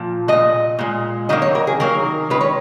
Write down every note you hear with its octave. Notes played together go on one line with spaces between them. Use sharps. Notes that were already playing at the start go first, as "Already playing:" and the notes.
Already playing: A#2 F3
A#2 G#3 D#5
A#2 G#3
D#3 F#3 A#3 D#5
C#5
A#4
G#4
D#3 F#3 A#3 A#4
D#3 G#3 B4
C#5